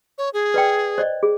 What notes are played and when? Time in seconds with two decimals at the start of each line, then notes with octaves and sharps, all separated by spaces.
0.18 C#5
0.34 G#4
0.54 B4 D5 G5
0.98 C5 D5 D#5
1.23 G#4